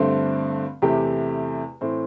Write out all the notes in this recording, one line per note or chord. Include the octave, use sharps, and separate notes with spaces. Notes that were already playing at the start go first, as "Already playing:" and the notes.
Already playing: G2 D3 A3 C4
E2 C3 A3 E4 G4
A2 E3 C4